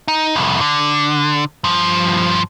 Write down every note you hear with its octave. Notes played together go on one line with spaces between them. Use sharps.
D#4
C2 F2
D3
G2 F3